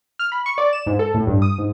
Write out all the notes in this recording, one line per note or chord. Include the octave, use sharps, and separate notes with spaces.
F6
B5
C#6
D5
E7
G#2
A4
A2
G2
D#6
G#2